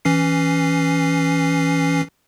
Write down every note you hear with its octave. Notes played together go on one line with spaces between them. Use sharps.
E3 C#4 C7